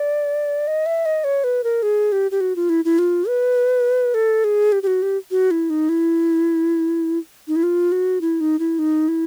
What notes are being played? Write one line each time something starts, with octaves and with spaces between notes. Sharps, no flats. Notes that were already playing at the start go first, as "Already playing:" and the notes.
Already playing: D5
D#5
E5
D#5
C#5
B4
A#4
G#4
G4
G4
F#4
F4
E4
E4
F4
B4
A4
G#4
G4
G4
F#4
G4
F#4
E4
D#4
E4
D#4
E4
F4
F#4
E4
D#4
E4
D#4
E4